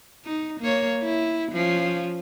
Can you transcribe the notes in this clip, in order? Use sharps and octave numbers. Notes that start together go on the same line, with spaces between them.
D#4
A#3 C#5
E4
F3 C#4